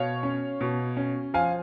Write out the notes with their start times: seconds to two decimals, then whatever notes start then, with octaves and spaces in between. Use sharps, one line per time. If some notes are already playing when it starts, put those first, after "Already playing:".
Already playing: B2 C#5 F5
0.23 C#4
0.61 B2
0.97 C#4
1.34 F3 F5 G#5